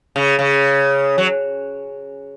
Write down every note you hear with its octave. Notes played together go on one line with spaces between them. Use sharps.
C#3
C#3
F#3